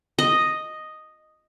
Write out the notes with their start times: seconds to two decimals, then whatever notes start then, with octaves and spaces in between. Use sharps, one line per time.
0.19 D#5